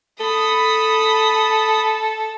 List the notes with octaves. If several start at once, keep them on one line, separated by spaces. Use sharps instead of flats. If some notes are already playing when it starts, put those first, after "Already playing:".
A4 B5 D#6